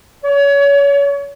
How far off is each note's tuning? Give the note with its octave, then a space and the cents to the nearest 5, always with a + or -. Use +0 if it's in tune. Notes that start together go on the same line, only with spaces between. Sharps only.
C#5 +30